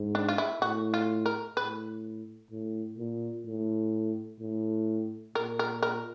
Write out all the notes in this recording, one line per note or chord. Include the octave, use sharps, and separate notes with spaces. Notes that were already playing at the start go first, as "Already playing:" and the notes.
Already playing: G#2
D4
F4
E4
A2 F#4
F4
A#4
A2 B4
A2
A#2
A2
A2
A#2 A#4
A#4
A#4